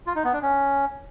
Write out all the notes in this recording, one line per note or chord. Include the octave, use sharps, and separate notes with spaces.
F4
D#4
B3
D4
C#4